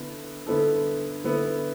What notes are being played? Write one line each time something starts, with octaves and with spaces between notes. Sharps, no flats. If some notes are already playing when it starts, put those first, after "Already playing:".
Already playing: D3 B3 E4 A4
D3 B3 E4 A4
D3 B3 E4